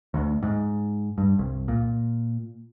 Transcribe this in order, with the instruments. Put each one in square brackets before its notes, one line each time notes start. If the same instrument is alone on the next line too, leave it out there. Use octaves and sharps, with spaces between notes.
[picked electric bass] D2
G#2
G2
C2
A#2